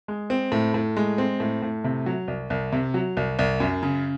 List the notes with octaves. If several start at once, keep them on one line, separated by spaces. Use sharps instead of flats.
G#3
C4
A2
A2
G#3
C4
A2
A2
C3
F#3
C2
C2
C3
F#3
C2
C2
F#2
C#3